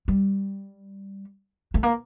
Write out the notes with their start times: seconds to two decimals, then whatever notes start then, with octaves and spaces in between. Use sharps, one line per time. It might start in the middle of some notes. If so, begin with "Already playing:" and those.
0.08 G3
1.74 A3
1.83 A#3